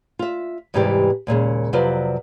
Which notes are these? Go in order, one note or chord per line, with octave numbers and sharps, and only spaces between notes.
F4 E5
E2 G#2 C3 E3 G3 G4
D#2 A#2 C#3 G#3
F2 C3 F#3 F4 B4 D5